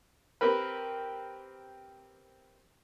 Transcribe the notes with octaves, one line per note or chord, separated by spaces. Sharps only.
C4 G4 A#4 B4